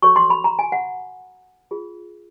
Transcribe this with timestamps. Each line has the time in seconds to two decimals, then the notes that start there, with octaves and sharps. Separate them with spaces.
0.02 F#4 A4 C#5 C#6
0.16 C6
0.30 B5
0.44 A#5
0.59 G#5
0.72 F#5
1.71 F4 G#4